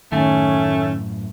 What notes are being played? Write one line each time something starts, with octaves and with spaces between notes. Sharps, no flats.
F#2 A2 D#3 A3 C#4 G#5